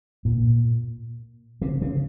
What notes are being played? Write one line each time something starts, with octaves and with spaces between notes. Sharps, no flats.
A#2
C3
C#3